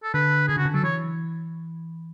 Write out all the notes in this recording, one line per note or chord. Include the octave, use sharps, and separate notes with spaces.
A4
D3 B4
D3 G#4
C#3 F#4
D3
F#3 A4
E3 C#5